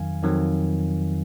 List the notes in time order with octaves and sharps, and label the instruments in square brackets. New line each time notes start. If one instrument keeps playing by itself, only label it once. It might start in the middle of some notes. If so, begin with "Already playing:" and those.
Already playing: [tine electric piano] F2 D#3 F#3 F5 G#5
F2 D#3 F#3